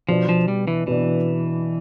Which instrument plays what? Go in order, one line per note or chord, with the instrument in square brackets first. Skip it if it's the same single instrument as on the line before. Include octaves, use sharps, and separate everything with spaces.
[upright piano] B2 B3 D4 [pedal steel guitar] F3
[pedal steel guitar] F3
G3
E3
[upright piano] B2 B3 D4 [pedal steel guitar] E3